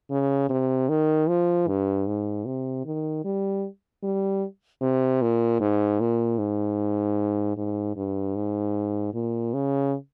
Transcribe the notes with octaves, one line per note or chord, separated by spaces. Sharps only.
C#3
C3
D#3
F3
G2
G#2
C3
D#3
G3
G3
C3
A#2
G#2
A#2
G#2
G#2
G2
G#2
A#2
C#3